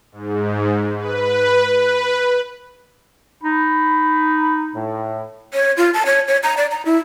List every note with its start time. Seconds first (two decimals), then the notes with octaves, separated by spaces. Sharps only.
0.12 G#2
0.98 B4
1.73 B4
3.43 D#4 B5
4.76 A2
5.54 C#5
5.77 F4
5.94 A5
6.06 C#5
6.28 C#5
6.43 A#5
6.57 D5
6.71 A#5
6.86 E4